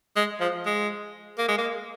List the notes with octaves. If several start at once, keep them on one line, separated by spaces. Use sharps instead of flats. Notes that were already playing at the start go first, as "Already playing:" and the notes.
G#3
F3
G#3
A#3
G#3
A#3